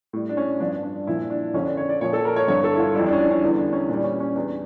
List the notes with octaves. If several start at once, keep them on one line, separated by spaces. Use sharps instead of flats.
A2 G3
D4
C#4
G2 F3 D4
D4
A#2 F3 E4
D4
F2 D3 F3 C#4
D4
C#5
D5
A#2 F3 C#5
A4
A#4
C#5
G2 D3 F3 C#5
A4
E4
F4
F2 E3 G3 E4
D4
C#4
D4
C#4
E2 D3 G3
D4
C#4
A#2 G3 D4
C#4
C#4
E2 E3 G3 D4